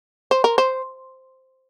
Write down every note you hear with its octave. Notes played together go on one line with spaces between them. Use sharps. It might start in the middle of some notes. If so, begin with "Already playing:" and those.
C5
A#4
C5